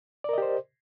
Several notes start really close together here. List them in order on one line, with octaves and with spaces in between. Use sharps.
D5 A#4 D#5 G4 C5